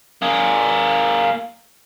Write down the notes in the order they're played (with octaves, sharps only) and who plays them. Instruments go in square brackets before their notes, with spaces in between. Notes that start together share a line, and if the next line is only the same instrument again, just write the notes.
[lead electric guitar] A#3 G#4